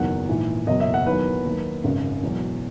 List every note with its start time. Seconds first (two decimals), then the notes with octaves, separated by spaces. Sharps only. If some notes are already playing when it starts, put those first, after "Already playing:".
Already playing: F#1 E2 D#3 F#3 F#5
0.29 A#1 G#2 E3
0.67 F#1 E2 B2 F#3 D#5
0.80 E5
0.94 F#5
1.06 E2 D#3 F#3 B4
1.45 D#2 D#3 F#3
1.84 G#1 F#2 C#3
2.23 E1 E2 B2 F#3